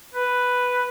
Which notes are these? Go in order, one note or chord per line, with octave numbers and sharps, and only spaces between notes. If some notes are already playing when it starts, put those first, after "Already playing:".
B4